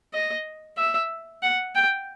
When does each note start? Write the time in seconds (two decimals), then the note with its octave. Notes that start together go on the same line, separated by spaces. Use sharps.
0.14 D#5
0.77 E5
1.43 F#5
1.75 G5